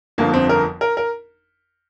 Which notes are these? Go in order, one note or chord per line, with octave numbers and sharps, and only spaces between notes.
G1 F2 D3 F3 A#3
C4
A#4
A#4
A#4